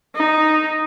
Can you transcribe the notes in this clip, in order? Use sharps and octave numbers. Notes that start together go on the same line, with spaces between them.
D#4